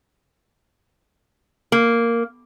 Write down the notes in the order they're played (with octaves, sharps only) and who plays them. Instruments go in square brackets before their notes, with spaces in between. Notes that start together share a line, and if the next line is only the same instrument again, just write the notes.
[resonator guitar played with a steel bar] A#3